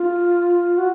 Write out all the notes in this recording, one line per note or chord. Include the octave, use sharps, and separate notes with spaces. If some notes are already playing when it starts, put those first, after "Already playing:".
Already playing: F4
F#4